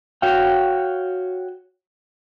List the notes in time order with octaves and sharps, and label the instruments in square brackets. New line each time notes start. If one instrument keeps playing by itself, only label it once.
[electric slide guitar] F#4 C#5 F5 G5